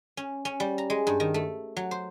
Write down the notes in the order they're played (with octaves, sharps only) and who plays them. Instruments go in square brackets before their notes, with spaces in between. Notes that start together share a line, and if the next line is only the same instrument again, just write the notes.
[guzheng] C#4
C#4
G3
A#5
G#3
G2
D#3
A3
F#3
C5